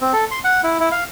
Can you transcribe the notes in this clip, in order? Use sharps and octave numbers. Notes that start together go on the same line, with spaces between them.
C4
A4
C6
F#5
E4
E4
F5